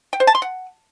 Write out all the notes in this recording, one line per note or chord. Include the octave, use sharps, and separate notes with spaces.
G5
C5
A5
C6
F#5